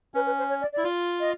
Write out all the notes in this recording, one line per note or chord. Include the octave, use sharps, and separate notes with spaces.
C#4 B4
B4
C5
C#5
D5
E4 D5
F4
D#5